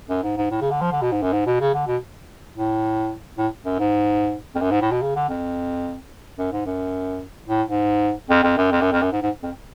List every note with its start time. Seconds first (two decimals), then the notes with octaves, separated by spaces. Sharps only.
0.09 F#2
0.23 G#2
0.37 G#2
0.51 A2
0.61 C#3
0.71 D3
0.81 F3
0.92 D3
1.02 B2
1.12 G#2
1.22 F#2
1.33 G#2
1.46 B2
1.60 C#3
1.74 D3
1.87 B2
2.56 A2
3.38 A2
3.65 F#2
3.79 G#2
4.55 F2
4.61 F#2
4.71 G#2
4.81 A2
4.92 B2
5.02 C#3
5.16 D3
5.29 F2
6.39 F#2
6.52 G#2
6.66 F#2
7.48 A2
7.68 G#2
8.30 F2
8.44 F2
8.57 F#2
8.71 F2
8.81 F#2
8.92 F2
9.02 F#2
9.12 G#2
9.22 G#2
9.43 F2